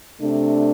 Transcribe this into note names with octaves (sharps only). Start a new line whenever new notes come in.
C3 A3 D4